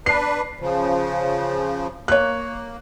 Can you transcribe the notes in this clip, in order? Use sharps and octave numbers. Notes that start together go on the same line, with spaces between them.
D4 B4 C7
C#3 F3
A#3 C#5 F#6